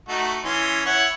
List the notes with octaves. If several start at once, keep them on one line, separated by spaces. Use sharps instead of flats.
A3 D#4 F#4
E3 C#4 C6
E4 C#5 F#5